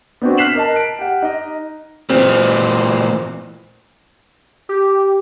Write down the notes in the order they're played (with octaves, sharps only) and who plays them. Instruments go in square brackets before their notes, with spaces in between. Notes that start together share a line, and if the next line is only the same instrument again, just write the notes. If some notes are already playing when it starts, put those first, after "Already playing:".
[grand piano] B3 C4 D4 F#4
F6 F#6 B6 C7 E7 F#7
A#4 D#5 A5
D7
G4 F#5
D#4 D#5
[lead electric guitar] A#2 E3 [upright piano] C4
[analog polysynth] G4